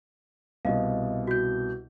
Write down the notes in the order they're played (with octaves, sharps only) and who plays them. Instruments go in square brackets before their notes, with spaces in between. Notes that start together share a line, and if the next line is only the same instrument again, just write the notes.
[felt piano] C2 B2 [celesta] D#5 F5
[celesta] F#4 G6